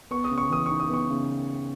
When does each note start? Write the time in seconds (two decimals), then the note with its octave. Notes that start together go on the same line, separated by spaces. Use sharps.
0.11 B3 C#6
0.24 D#6
0.31 C#3
0.38 C#6
0.50 E3 D#6
0.66 D#4 C#6
0.80 D#6
0.89 B3 C#6
1.10 C#3